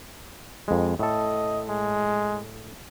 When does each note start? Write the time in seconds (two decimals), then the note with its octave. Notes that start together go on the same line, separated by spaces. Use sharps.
0.68 F2 G#3
0.99 A2 A4 D#5
1.68 G#3